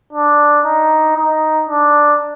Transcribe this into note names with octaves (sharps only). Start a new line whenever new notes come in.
D4
D#4
D#4
D4